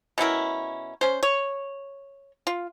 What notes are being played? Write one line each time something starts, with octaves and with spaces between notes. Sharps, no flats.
B2 C#4 E4 A#4
C#4 C5
C#5
F4